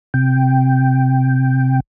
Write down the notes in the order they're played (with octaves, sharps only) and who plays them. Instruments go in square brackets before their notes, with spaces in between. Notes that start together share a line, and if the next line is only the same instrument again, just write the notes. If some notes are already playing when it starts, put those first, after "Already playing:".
[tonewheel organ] C3 G5